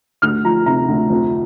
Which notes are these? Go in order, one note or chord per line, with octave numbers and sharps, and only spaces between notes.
D2 F6
F3 A#5
C3 A#5
D2
F2